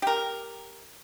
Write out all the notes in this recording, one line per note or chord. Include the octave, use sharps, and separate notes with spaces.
G4 A#4